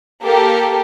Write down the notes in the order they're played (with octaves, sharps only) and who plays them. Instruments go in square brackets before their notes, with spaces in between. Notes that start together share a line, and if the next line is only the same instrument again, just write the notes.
[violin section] A#3 G4 A4 A#4